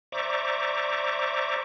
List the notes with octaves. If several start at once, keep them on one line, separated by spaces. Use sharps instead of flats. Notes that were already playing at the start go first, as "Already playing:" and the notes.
C5 D5 E5 A#5 C#6 D6